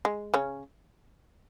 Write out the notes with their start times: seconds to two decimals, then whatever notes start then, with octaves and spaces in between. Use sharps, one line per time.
0.05 G#3
0.34 C#3 C#4